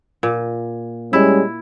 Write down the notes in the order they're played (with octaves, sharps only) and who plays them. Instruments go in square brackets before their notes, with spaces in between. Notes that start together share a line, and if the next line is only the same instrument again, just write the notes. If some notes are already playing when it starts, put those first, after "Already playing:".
[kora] A#2
[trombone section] G3 G#3 C#4 [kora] E4